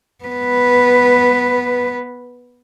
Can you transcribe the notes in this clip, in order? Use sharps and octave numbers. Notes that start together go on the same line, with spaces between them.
B3 B4